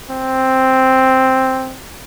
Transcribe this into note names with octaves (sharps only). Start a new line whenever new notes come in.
C4